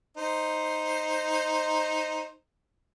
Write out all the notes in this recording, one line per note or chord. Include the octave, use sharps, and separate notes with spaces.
D#4 C5